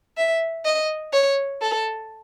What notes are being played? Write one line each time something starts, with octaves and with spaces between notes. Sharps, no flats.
E5
D#5
C#5
A4